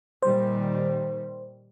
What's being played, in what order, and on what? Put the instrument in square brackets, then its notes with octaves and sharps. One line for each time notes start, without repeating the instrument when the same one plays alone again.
[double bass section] A#2 D#3 G3 [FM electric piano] C5